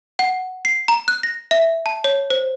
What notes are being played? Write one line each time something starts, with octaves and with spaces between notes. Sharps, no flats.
F#5
C7
A#5
F#6
A#6
E5
A5
C#5
C5